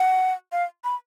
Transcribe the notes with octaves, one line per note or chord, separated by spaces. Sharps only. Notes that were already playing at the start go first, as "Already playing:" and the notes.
Already playing: F#5
F5
B5